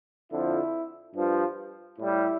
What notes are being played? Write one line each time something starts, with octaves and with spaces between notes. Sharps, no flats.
F2 D3 F3 E4
G2 F3
A2 G3 E4